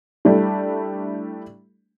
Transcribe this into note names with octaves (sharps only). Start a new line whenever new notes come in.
G3 A3 D4 E4